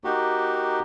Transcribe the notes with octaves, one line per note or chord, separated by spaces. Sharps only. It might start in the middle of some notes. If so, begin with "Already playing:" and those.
A#3 D#4 F#4 G4